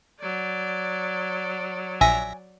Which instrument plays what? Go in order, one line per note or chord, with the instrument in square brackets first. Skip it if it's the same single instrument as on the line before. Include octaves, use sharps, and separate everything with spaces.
[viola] F#3 D5
[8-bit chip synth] A#1 E5 A#6 [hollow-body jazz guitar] G#5